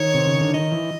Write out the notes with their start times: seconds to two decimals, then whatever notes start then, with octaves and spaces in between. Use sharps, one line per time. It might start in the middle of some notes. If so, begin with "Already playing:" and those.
Already playing: D#3 C#5
0.14 C3
0.27 C#3
0.41 D3
0.54 D#3 D#5
0.72 E3